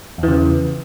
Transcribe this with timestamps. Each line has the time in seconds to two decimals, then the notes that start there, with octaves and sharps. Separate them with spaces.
0.18 E2
0.23 E3
0.28 C#3